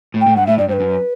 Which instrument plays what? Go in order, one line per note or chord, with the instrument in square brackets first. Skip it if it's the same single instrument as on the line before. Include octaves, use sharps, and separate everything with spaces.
[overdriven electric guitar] A2
[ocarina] G5
[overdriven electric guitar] A2
[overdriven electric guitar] G2 [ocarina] F#5
[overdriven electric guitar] A2 [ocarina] E5
[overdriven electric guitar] G2 [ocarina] D5
[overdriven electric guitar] G2 [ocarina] C5
[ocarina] B4
[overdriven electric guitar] F#2